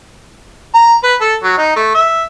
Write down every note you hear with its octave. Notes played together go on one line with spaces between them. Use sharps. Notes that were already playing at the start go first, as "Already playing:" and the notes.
A#5
B4
A4
F#3
D#4
A3
E5